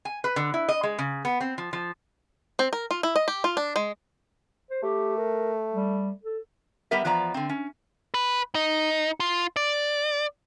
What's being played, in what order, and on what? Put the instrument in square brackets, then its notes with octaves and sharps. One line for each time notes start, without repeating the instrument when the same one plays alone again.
[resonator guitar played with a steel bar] G#5
B4
D3
E4
D#5
G#3
C#3
B3
C4
F3
F3
[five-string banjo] C4
A#4
F4
E4
D#5
G4
F4
D4
G#3
[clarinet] C5
[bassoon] A3 [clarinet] G4
[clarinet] A#4
G3
A4
[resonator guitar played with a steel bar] G3 B3 G4 A#4 E5
E2 F3 B3 D5 A#5
D3 C4
C#4
[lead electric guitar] B4
D#4
F4
D5